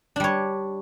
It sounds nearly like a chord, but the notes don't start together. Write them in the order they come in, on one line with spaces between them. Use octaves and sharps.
D4 G3 C#5